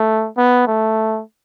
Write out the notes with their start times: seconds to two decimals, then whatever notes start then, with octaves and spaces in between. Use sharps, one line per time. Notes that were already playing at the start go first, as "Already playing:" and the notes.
Already playing: A3
0.37 B3
0.67 A3